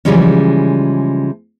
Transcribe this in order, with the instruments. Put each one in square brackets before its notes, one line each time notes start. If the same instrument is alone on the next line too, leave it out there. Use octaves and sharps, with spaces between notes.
[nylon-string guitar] C#3 E3 F3 G3 G#3 C#4